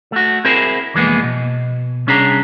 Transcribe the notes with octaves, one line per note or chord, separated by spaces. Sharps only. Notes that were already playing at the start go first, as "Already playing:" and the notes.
A3 F#4
C4 E4 G#4 A#4 C5
C2 F2 E3 G#3 A#3 B3
B2
C2 C#4 D4 G#4 A#5